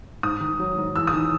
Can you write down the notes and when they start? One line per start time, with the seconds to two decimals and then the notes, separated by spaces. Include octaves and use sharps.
0.23 G#2 D#6
0.41 D#3
0.59 F#3
0.77 G#2
0.96 E2 E6
1.07 D#6
1.14 D#3